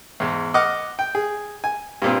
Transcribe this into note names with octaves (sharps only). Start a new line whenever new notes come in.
E2 G#2
D#5 F#5 D6 F6
G5
G#4
G#5
G2 A#2 C4